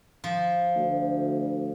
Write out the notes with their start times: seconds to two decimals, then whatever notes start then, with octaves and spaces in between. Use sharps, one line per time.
0.24 F3
0.76 D2